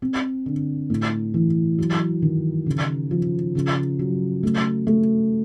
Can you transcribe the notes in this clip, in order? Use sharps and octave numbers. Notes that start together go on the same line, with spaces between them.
C4
D3
A2
E3
F#3
D#3
C#3
F3
C#3
F#3
A3
A3